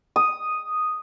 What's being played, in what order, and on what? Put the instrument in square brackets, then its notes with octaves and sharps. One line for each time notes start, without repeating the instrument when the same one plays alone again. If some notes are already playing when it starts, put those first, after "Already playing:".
[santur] D#6